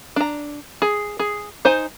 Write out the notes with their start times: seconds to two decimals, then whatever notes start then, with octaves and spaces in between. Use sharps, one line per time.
0.16 D4 A#5
0.82 G#4
1.19 G#4
1.65 D#4 C5 G#5